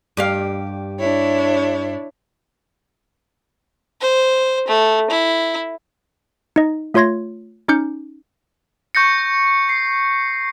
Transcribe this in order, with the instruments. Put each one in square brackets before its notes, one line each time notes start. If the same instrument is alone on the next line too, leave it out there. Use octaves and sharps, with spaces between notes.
[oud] G2 G4 F5
[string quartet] D4 E4 C#5
[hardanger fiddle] C5
A3
E4
[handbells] D#4 D#5
A3 F4 C#5 C6 G#6 A#6
C#4 D#4 D6 F6 G6 C#7
[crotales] C#6 G6 A#6 C#7
C7